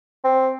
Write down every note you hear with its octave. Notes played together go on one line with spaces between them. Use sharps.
C4